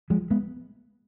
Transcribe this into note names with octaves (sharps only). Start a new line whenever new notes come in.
F3 G#3
G#3 B3